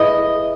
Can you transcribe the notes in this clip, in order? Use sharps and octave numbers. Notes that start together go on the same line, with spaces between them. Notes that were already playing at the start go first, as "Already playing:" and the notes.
Already playing: E4 G#4 B4 D#5 E5 B5